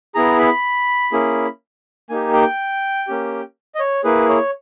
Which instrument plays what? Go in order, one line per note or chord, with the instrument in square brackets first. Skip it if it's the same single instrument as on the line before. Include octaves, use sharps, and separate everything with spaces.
[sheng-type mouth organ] B3 E4 G#4 A#5
B5
A#3 C#4 E4 G#4
A#3 D#4 G4 G#5
G5
A#3 C#4 G4
D#5
C#5
A#3 E4 G#4 B4
C#5